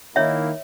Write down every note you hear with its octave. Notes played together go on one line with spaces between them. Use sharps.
D#3 A#3 E4 C#5 E5